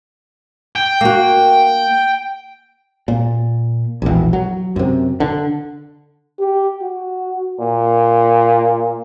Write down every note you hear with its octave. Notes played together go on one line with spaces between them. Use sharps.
G5
A#3 F#4
A#2
E1 A#1
F#3
F#2 C3
D3
G4
F#4
A#2